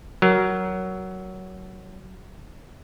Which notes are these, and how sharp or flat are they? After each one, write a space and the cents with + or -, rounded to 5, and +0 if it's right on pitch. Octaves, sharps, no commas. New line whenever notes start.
F#3 +15 A#4 +5